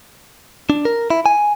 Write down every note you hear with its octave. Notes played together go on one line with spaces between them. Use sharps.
D4
A#4
E4
G#5